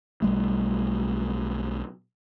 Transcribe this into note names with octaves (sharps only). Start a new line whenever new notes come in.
B1 G3 A3